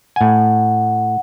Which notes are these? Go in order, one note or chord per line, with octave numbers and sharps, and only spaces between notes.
A2 F#5 G#5